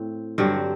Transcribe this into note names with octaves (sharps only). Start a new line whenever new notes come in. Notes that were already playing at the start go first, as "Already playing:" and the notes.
Already playing: A2 C4
G2 D3 F#3 C4